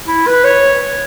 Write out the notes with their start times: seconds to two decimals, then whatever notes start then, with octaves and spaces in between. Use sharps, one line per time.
0.07 E4
0.27 B4
0.44 C#5